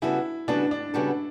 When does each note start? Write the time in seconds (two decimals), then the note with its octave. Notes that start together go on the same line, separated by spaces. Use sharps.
0.02 C#3 G3 B3 E4 F#4 A4
0.48 C#3 G3 B3 D4 F#4 A4
0.71 D4
0.94 C#3 G3 B3 F#4 A4